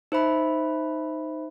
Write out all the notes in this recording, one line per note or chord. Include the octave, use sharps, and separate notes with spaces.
D#4 C5 E5 B5